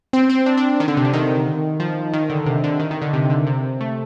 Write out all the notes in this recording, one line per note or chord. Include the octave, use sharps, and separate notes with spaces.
C4
C4
D4
D4
D#3
D3
C3
D3
D#3
F3
D#3
D3
C3
D3
D#3
D#3
D3
C3
D3
C3
A3